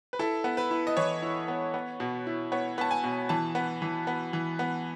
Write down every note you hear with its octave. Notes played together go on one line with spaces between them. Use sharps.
B4
E4 A4
B3
B4
E4
D#5
E3 C#5
E4
B3
B3
B2
E4
B3 C#5
B3 A5
G#5
B2
E3 A5
B3
E3
B3
E3
B3